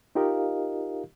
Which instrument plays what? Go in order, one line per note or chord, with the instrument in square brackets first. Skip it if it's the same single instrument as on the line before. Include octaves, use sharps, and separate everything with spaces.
[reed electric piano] D#4 F4 G4 A#4 D#5 F5